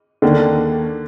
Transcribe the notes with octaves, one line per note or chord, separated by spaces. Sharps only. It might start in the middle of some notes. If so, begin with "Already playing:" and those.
D#2 D3 D#3 A#3 D4